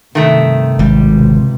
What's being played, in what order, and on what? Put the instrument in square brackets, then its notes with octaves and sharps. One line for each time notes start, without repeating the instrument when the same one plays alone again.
[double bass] G2 C3 [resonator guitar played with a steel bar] D#3 A3
[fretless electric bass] G#1 [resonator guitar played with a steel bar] G3
[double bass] C#2 C3